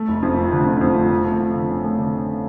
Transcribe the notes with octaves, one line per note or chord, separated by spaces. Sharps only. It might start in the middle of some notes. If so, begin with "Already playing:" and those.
Already playing: A3
F1
F2
A3
D3
F2
F2
A3
F3
A3
F3
D3
C#4
A3
D3
C#4